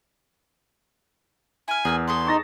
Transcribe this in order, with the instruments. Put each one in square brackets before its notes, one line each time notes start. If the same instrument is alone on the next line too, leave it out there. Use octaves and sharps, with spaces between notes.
[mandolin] E4 F6 [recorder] G#5
[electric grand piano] E2 [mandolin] G#4 A#4 E6
[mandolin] G#4 A4 D5 [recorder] C6
[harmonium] D#4 [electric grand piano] C#6 A6 A#6